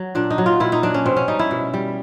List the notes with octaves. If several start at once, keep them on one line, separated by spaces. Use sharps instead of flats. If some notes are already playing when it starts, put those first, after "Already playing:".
Already playing: F#3
A#2 D4
D#4
F#3
F4
A#2 E4
D#4
F#3 D4
C#4
B2 C4
C#4
G3 D#4
E4
B2
G3